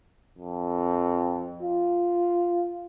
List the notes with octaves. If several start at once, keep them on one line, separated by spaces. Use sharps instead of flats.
F2
F4